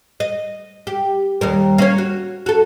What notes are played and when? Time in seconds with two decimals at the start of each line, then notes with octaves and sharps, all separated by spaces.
0.20 D#5
0.87 G4
1.41 D#2 G3 A#4
1.78 A#3 C#4 C#5
1.98 F#4
2.46 F#4 A4